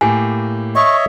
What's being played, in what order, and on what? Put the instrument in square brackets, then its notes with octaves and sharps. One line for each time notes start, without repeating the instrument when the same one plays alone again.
[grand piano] A2 A#3 G4 [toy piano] G#5
[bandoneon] C#5 D#5 E5 [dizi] C#6